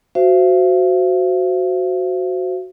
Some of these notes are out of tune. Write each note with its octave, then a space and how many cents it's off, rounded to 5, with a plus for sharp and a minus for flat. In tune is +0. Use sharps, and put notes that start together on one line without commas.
F#4 +0 C5 -10 E5 +45